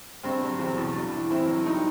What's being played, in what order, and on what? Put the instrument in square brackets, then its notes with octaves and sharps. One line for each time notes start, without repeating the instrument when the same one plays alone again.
[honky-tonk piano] G2 C4
F#3
E2 C4
B2
G2
E3
A2 C4 E4
F#3
G2 D#4